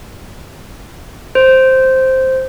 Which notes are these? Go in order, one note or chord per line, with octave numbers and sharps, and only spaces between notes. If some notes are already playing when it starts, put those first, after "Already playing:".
C5